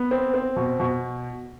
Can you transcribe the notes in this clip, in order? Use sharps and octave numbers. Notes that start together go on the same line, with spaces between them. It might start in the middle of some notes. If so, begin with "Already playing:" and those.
Already playing: B3
C4
C4
B2
B2